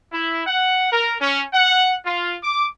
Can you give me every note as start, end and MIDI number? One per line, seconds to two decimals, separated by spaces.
0.12 0.41 64
0.46 0.89 78
0.91 1.14 70
1.20 1.43 61
1.53 1.93 78
2.05 2.35 65
2.42 2.65 86